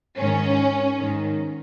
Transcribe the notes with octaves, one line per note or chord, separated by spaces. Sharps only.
G#2 D#3 C#4
G#2 D#3